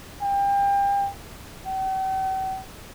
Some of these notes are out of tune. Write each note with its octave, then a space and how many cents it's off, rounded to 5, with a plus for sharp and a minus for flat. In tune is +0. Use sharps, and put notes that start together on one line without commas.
G5 +30
G5 -45